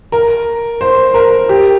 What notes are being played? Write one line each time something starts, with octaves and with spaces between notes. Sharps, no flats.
A#4
C5
A#4
G4